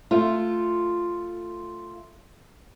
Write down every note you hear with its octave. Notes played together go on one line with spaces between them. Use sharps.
A3 F4